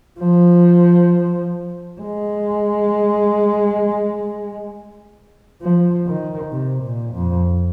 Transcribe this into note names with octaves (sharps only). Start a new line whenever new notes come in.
F3
G#3
F3
D#3
C3
A#2
F2